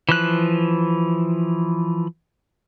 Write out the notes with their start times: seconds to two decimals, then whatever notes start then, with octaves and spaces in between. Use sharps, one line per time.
0.09 E3 F3 F#6